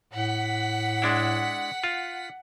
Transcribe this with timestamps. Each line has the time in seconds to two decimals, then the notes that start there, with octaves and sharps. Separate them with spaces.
0.13 A2 F#5 B6
1.02 G#3 D4 E4
1.84 F4